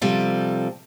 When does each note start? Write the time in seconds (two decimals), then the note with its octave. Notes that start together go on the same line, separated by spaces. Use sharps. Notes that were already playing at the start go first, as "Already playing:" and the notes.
0.02 C3 F3 G3 A4